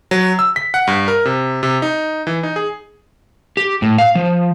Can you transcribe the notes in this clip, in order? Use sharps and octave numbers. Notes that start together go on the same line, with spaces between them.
F#3
E6
B6
F#5
G2
A#4
C3
C3
D#4
E3
D#4
G#4
G4
A2
F5
F3